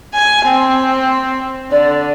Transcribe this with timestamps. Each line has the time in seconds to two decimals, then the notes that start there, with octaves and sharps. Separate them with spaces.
0.14 G#5
0.46 C4
1.71 D3 D5